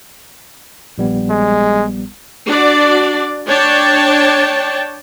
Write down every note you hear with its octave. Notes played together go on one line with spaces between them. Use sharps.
A#1 G3 B3
G#3
D4 F#4 D5
D4 C#5 G5 A5